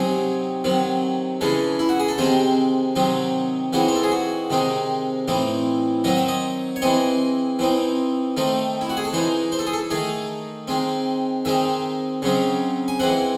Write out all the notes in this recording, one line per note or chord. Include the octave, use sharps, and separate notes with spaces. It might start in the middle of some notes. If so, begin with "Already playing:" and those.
Already playing: C3 F#3 C4 D#4 G#4
C3 D#3 F#3
C#3 E3 G#3 A4
E4
F#4
G#4
A4
C3 D#3 G#3 C4 C5
C3 D#3 F#3 C4 D#4
E3 G#3 C4 D#4 F#4
C5
A4
G#4
F#4
C3 D#3 G#3 C4 D#4
A2 E3 C4 D#4
D#3 F#3 C4 D#4 D#5
E5
D#5
C#5
E3 G#3 C4 D#5
E3 C4 D#4
D#3 A3 C4 D#4
E4
F#4
G#4
A4
E3 G#3 D#4 C5
C5
A4
G#4
A4
D#3 A3 D#4 G#4
D#3 G#3 C4
D#3 G#3 C4 D#4 E5
C#3 F#3 C4 D#4
G#5
E3 G#3 C4 F#5